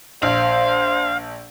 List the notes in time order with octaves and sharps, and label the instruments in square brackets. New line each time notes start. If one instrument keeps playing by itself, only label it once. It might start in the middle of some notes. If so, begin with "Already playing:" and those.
[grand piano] A#1 [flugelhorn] C5 [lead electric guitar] F5